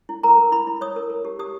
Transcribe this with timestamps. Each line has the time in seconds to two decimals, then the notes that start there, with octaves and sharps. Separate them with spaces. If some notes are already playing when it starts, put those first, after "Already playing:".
0.09 E4
0.23 A#4 A#5
0.38 A#4
0.52 E4 B5
0.67 E4
0.81 C#5 D#6
0.96 A#4
1.10 A#4
1.25 G4
1.39 G4 D#6